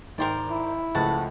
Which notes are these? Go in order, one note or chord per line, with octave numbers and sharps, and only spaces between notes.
G#1 A#4 C5 D5 G5
E4
C#2 F3 A3 F#4 F#5 A5